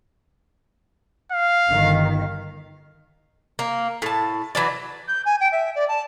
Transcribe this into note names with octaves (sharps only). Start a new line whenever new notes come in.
F5
G1 D#3
A#3
A2 A5
E3 F#3 D5
G6
G#5
G5
E5
D5
A5